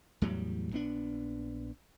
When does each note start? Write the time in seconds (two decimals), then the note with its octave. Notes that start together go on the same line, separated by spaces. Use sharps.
0.22 E2 A2 F#3 G3
0.72 A#1 B3 D4